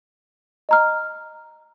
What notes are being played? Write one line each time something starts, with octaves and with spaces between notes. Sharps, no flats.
D#5 A#5 F6